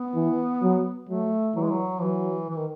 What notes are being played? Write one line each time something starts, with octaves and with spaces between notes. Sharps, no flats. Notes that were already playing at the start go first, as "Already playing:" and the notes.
Already playing: B3
E3
F#3
F#3 A3
E3 F#3
G#3
F#3
E3 F#3
E3
D#3